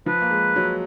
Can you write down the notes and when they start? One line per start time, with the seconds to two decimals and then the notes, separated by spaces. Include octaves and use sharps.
0.06 F3 B4
0.22 A#3
0.31 G#3
0.56 F#3